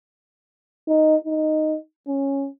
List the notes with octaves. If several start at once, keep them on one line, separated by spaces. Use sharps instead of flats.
D#4
D#4
C#4